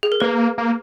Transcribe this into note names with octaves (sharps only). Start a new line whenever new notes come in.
G#4
A#4
A#3 B4
A#3